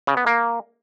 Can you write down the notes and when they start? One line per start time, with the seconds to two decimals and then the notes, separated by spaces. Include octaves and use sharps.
0.07 C#3
0.17 B3
0.26 A#3